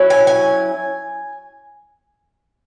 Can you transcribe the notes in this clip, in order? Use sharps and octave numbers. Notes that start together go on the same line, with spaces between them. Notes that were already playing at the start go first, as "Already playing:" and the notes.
Already playing: F#3 C#4 E4
G#5
G#5